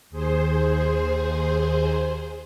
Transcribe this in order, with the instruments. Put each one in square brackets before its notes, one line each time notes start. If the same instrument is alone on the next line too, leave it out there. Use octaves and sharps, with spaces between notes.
[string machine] D#2 G#4 C5